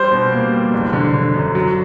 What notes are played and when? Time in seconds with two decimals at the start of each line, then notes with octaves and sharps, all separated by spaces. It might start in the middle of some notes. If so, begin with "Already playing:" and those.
Already playing: G3 C5
0.11 B2
0.32 A#3
0.52 G3
0.73 F#1
0.93 D3
1.14 D3
1.34 F#2
1.55 F#3